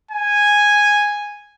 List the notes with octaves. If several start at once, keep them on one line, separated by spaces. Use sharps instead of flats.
G#5